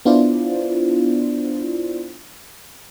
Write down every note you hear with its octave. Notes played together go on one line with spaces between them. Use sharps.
B3 D4 E4 F4 C5 D5